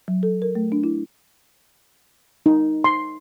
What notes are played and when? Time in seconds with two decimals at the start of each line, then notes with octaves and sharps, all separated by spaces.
0.08 F#3
0.23 A4
0.42 A#4
0.55 A3
0.72 D4
0.84 E4
2.46 D#4
2.84 C6